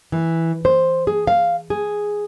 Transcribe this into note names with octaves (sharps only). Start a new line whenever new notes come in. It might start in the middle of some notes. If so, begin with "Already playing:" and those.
E3
C5
G#4
F5
G#4